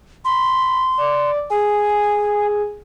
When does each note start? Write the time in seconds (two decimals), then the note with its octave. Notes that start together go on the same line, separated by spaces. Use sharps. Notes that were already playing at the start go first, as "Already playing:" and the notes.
0.25 B5 C6
0.98 D5
1.50 G#4 G#5